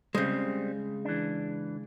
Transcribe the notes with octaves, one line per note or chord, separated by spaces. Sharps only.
C#3 G3 G#3 C4
E3 D4